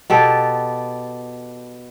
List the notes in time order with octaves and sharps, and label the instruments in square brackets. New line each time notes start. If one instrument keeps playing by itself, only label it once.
[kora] B2 G4 A4